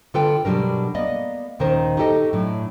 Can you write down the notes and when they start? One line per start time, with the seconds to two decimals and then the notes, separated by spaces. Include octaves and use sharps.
0.14 D3 F4 A4 B4 G5
0.45 B2 F#3 G3 D4 A#4
0.94 A#3 B3 D5 D#5
1.59 D#2 A#2 D#3 C#4 A#4 C5
1.97 D#4 F#4 G4 A4 D#5
2.33 A2 F#3 D4